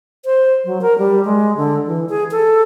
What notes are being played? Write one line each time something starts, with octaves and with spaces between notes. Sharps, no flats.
C5
F#3
A#4
G3
G#3
D3
E3
G#4
A4